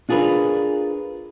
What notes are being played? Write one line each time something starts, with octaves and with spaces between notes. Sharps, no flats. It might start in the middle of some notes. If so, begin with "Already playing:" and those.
D4 F4 G#4 A#4 B4